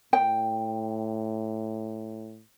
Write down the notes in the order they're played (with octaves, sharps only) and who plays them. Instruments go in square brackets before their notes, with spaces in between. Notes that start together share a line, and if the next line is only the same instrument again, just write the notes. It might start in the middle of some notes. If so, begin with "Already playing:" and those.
[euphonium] A2 [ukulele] G5